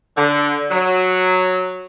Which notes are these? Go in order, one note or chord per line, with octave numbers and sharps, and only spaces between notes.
D3
F#3